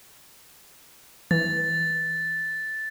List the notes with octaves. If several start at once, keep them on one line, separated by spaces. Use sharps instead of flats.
E3 A6